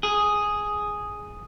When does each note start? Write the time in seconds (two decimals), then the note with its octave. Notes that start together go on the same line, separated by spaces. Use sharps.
0.03 G#4